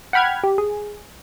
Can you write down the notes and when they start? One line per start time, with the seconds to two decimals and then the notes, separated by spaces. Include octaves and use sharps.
0.13 F#5 G5 B5 F6 G#6
0.44 G4
0.58 G#4